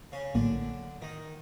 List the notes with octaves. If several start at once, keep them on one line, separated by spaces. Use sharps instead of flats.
C#3 C#4
A#1 A2 D3 F#3 A#3 D4
D#3 D#4